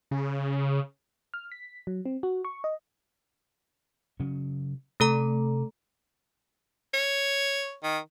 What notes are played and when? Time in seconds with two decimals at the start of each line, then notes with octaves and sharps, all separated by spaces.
0.11 C#3
1.34 F6
1.52 B6
1.87 F#3
2.06 C4
2.23 F#4
2.45 C#6
2.64 D#5
4.20 C#3 F#3 C#4
5.00 C3 A3 A4 A#5
6.94 C#5
7.83 D#3